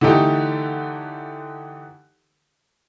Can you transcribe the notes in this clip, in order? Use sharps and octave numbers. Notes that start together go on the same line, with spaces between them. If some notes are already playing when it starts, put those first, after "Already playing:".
D3 E3 A3 D#4 G4 A4